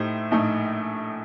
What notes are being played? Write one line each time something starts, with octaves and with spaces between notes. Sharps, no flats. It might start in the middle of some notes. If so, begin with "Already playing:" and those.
Already playing: A2 A3 D#4 G4 C5
A#1 A2 A3 D#4